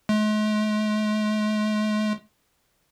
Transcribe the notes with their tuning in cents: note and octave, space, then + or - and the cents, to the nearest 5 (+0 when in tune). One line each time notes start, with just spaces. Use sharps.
G#3 +45